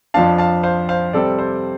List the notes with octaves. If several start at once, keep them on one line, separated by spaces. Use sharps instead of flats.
F2 F3 D4 F5 A5
F5 A5
C5 F5
C5 F5
C3 G3 C4 A4 D5
C5